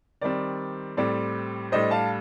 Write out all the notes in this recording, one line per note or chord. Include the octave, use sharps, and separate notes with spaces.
D#3 G3 C4 D5
A2 G3 C4 D5
A2 G3 D4 C5 D#5
F5 A5